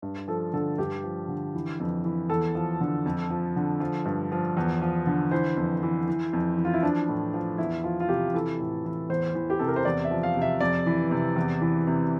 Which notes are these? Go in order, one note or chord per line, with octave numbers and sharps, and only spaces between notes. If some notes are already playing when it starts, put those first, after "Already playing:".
G2
F3 A4
D3 A4
G2 G4
F3
D3
E3
F2
E3
E2 A4
F3
D3
F2
F3
D3
F3
G2
F3
E2
F3
D3
E3 C5
F2
E3
E3
F2
E3
F4
E4
F3 D4
A2
F3
E2 E4
F3 F4
F4
C3 G4
E3 A4
A2
E3
E2 C5
E3
G4
C3 A4
A#4
C5
E2 D5
E5
F3
F5
C3
E5
F2 D5
E3
C3
E2
E3
C3